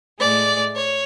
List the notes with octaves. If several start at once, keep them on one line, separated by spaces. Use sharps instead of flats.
A2 G#3 D5
C#5